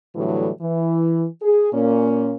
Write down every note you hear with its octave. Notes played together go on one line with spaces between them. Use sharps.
A2 D3 E3 F#3 G3 A3
E3
G#4
A#2 A#3 C#4